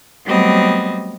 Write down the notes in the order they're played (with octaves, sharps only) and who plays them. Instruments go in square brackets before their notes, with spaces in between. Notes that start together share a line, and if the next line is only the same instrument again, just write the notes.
[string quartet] F#3 G3 A3 B3 C4 D#5